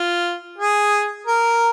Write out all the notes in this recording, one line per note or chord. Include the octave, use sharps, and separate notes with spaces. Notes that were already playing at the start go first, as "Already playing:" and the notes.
Already playing: F4
G#4
A#4